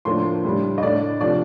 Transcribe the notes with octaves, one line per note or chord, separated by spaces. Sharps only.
A2 F3 A#3 D4 C6
A2 G3 D4
D#5
A2 A3 D4 D5
C3 F3 A3 D4 D5